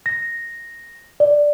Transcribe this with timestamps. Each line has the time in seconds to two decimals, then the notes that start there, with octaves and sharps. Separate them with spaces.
0.06 A#6
1.20 D5